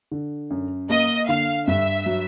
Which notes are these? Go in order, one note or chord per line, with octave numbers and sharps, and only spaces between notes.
D3
F#2
A#3 D#5
D3 F5
G2 E5
F#3